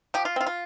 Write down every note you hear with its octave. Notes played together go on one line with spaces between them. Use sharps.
F3 G4
F4
C4 F4
F4